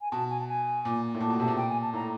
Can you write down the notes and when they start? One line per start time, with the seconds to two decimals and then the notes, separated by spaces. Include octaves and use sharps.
0.01 G#5
0.11 B2 A5
0.30 G#5
0.40 A5
0.48 G#5
0.85 A#2
1.14 A2
1.20 A#2 A5
1.30 B2
1.40 C3 A5
1.48 A#2
1.57 G5
1.69 G#5
1.82 A5
1.93 A2 A#5